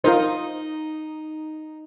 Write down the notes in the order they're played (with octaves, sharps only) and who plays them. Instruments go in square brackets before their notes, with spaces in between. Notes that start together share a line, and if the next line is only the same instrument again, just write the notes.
[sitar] D#4 [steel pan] F4 A#4 C5